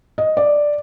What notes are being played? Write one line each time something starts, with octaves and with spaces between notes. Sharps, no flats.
D#5
D5